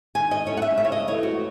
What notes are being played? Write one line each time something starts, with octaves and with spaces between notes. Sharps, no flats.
D#3 G#5
D#5
A3 C#4 E4 C#5
F#5
E5
C#3 E5
C#5
D#5
E3 A3 C#5
F#4